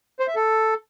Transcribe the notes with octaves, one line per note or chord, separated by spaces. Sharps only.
C5
E5
A4